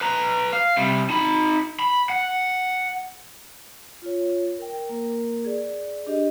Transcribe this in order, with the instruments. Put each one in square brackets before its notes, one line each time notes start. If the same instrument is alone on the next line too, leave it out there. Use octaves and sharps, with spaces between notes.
[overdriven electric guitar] B4 A#5
F5
C3 G3
D#4 B5
B5
F#5
[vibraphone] F4 C#5
A#4 G5
A#3 A#4
G#4 D5
D4 G4 D#5